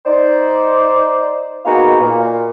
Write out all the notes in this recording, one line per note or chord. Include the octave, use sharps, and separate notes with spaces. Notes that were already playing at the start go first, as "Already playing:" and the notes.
D#4 C5 D5
A#3 B3 D#4 F#4 G#4 F5
A#2